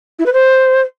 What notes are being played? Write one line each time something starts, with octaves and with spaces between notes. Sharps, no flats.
E4
B4
C5